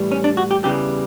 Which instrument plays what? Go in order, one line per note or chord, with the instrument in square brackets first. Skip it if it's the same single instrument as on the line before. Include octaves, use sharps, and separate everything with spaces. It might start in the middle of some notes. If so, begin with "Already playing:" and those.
Already playing: [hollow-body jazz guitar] A2 E3 G3
C#4
D4
F#4
G4
E2 C#3 E3 G3 G4